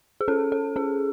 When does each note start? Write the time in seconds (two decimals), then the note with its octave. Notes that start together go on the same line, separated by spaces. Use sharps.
0.21 G#4
0.28 C#4 A4
0.52 A4
0.76 C#4 G#4